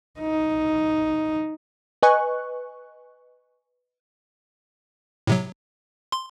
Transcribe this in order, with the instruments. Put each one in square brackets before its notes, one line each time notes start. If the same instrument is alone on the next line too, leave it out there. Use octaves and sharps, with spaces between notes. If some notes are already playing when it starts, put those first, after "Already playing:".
[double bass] D#4
[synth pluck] B4 D#5 G#5 C#6 F#6
[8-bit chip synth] A2 C3 F#3
C6